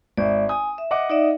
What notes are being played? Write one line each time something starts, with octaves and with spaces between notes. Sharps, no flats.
G#1 D5 E5
G#5 D#6
E5
D#5 F#5 D6
D#4 D5 E5